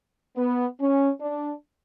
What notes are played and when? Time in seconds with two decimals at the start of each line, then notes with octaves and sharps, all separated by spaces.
0.36 B3
0.79 C#4
1.20 D4